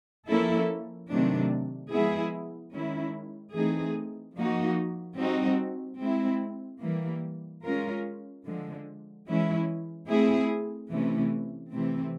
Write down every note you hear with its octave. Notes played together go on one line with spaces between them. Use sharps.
F3 A#3 C#4 E4 A4
C3 D#3 F#3 A3 D4
F3 G#3 B3 E4 G#4
D#3 G#3 C#4 E4
E3 A3 C4 D#4 G#4
F3 A#3 D#4 F#4
G3 C4 D#4 F#4
G#3 C4 E4
E3 G3 A#3
G#3 C#4 F4 A#4
D3 F3 G#3
E3 G#3 C#4 E4
A3 C4 E4 G#4
C3 E3 A3 C#4
C3 E3 A3 C4